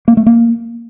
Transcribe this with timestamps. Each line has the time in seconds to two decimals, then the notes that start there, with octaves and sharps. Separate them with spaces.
0.08 A#3
0.17 A3
0.26 A#3